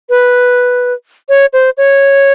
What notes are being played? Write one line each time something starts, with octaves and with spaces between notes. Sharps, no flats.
B4
C#5
C5
C#5